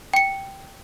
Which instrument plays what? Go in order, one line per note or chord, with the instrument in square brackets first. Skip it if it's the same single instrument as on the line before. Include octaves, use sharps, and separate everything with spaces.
[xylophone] G5 C#7